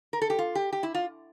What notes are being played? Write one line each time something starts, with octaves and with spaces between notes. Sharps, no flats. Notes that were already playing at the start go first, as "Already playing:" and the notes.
A#4
A4
G4
F4
G4
G4
E4
F4